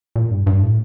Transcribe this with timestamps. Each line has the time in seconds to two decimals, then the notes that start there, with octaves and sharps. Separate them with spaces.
0.16 A#2
0.31 G2
0.47 G2
0.62 A2